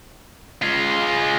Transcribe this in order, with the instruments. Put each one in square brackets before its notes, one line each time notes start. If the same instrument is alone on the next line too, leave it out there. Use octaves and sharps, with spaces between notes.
[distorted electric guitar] G#3 F4